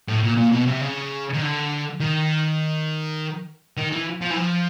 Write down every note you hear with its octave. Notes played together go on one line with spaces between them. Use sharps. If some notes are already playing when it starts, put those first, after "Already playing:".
A2
A#2
A#2
B2
C3
C#3
D#3
D3
D#3
D#3
E3
F3
E3
F3